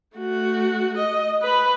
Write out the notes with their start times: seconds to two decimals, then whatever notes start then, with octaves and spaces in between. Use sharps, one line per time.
0.16 A3 F#4
0.97 D#5
1.42 B4 B5